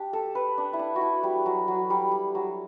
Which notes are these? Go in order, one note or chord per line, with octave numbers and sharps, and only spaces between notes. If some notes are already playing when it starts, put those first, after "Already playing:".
Already playing: D4 G4
A4
B4
D4
E4
D4
F#4
E4
G3
F#3
F#3
G3
G3
F#3